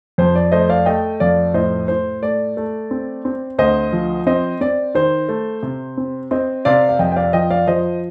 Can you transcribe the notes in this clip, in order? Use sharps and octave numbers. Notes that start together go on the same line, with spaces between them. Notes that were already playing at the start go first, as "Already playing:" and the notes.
F2 C5
D5
A3 C5 D#5
D5 F5
A3 D#5 G5
F2 D5 F5
A2 C5 D#5
A2 C5
A3 D5
A3
C4
C4
D2 C5 D#5
F3
C4 C5 D#5
C4 D5
D#3 C5
A3
C3
C4
C4 C5 D#5
C3 D5 F5
F5
F2 D#5 G5
G5
D5 F5
F3 D#5 G5
D5 F5
F3 C5 D#5